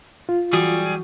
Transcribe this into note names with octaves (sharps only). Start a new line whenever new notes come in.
F4
E3 F#3 G3 F#4 G#4